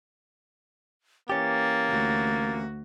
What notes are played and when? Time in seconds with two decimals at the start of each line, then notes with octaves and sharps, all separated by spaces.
1.30 E3 A#3 C#4 G4 A6
1.89 D2 F#4